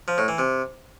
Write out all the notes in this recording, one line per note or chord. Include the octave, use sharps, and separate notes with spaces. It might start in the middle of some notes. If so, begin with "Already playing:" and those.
F3
A2
E3
C3